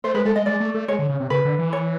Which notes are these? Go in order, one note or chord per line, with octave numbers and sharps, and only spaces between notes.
A3 C5
G#3 B4
G#3 A4
G#3 D#5
G#3 D5
A3
A3
G#3 C#5
D3
C#3
C3
C#3 B4
D3
E3
C#5